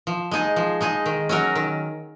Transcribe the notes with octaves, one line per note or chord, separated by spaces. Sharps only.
F3
G#3 D#4 G#4
F3
G#3 D#4 G#4
D#3
F#3 C#4 F#4 A#4
D#3